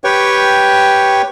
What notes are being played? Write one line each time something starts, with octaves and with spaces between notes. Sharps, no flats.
G4 B4 C#5 G5 C#6